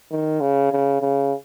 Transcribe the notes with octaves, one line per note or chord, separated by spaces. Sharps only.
D#3
C#3
C#3
C#3